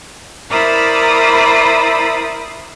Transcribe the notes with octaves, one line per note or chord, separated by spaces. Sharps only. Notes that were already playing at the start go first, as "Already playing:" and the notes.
E4 A#4 C5 D5 B5 D#6